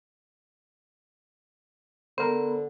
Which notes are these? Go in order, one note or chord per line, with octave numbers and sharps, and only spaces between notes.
D3 B3 A#4 C5